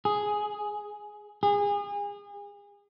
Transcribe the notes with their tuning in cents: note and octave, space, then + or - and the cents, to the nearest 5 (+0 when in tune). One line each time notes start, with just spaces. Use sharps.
G#4 +5
G#4 -30